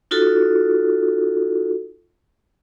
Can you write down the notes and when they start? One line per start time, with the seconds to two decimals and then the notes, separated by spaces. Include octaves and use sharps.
0.11 D#4 F4 F#4 A4